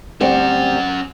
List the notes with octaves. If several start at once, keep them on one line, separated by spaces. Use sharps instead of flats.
D2 G3 C4 C#4 F#5